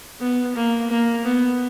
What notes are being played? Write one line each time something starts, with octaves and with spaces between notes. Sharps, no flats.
B3
A#3
A#3
B3